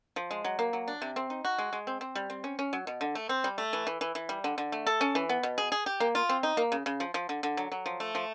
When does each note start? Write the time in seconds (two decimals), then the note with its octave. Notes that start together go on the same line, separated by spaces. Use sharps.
0.16 F3
0.31 G#3
0.45 F#3
0.59 A#3
0.73 F#3
0.88 D4
1.02 C3
1.16 C4
1.30 D#4
1.45 F#4
1.58 G#3
1.73 G#3
1.87 C4
2.01 C4
2.15 G3
2.30 C4
2.44 C#4
2.59 C#4
2.73 F#3
2.87 B2
3.01 D3
3.15 A3
3.29 C4
3.44 G3
3.58 A3
3.73 E3
3.87 E3
4.01 E3
4.15 E3
4.29 G3
4.44 D3
4.58 D3
4.72 A3
4.87 A4
5.01 C#4
5.15 E3
5.29 B3
5.43 B2
5.58 G#4
5.72 G#4
5.86 G4
6.00 A#3
6.15 F4
6.29 C4
6.43 D#4
6.57 A#3
6.72 C#3
6.86 C#3
7.00 F3
7.14 F3
7.29 D3
7.43 D3
7.57 F#3
7.72 F#3
7.86 F3
8.00 A3
8.15 F3